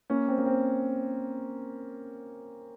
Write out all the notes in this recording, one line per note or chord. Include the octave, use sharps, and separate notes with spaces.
A#3 C#4
C4
A#3
C4